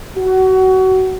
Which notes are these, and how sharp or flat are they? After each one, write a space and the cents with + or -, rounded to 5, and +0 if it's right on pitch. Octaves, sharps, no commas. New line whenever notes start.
F#4 +25